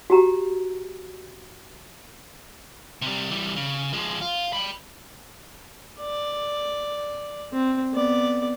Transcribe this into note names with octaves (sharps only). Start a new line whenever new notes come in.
F#4 G4 A#5
C3 G3
E3 G3
C#3
F3 G#3
F4
G5 B5
D5
C4
B3 D5